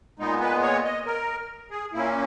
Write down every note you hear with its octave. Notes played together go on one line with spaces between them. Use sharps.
A#2 G#3 B3 D#4
B4
C#5
D#5
A#4
G#4
A#2 A#3 C#4 E4